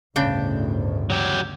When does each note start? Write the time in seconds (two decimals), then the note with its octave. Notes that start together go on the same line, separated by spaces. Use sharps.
0.16 G1 D2 A2 C#3 D4 G5
1.10 F#3 G4